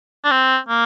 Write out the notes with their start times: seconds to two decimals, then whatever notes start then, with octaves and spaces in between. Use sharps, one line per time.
0.25 D4
0.31 C4
0.69 A#3